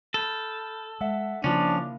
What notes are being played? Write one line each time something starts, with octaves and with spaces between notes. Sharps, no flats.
A4 B5 F6 G6
G#3 E5 F#5 E6
C#3 F3 A#3 C#4 D4 E4